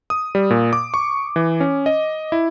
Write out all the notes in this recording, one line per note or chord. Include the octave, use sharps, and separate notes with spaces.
D#6
G3
A#2
D6
C#6
E3
C#4
D#5
E4